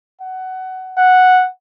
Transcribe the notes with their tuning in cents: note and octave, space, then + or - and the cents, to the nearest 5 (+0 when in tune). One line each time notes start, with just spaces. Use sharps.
F#5 +20
F#5 -5